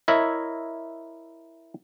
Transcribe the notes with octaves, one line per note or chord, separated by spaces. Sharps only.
E4 A#4 C#5 D#5 E5